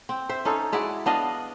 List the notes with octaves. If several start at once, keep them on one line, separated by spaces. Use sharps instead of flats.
C4
C5 E5
C#4 D#4 A4
G#3 E4 F#4 D5
B3 D4 D#5 F5